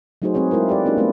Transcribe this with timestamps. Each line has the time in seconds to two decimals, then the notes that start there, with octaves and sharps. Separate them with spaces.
0.22 F#3 A3 D#4 F#4 G#4 C5
0.34 G#3 C4 G#4 B4 C#5
0.51 G#3 E4 F4 A#4 C5
0.69 G4 B4 D5
0.85 A#3 C#4 D#4 F4 G4
0.97 G#3 A3 B3 C4 G4 B4